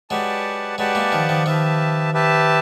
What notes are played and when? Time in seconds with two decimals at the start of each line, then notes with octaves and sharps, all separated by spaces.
0.10 F#3 G#3 G4 B4 D5 F#5 A5
0.78 F#3 G#3 G4 B4 D5 F#5 A5
0.95 G#3 A#3
1.12 D#3 F3
1.29 D#3 F3
1.46 D#3 F3 G4 B4 E5 A5
2.14 G4 B4 E5 A5